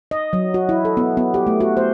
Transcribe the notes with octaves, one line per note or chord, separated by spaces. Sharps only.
D#5
F#3
F#4
E4
A4
B3
B3
G4
A3
F#4
C5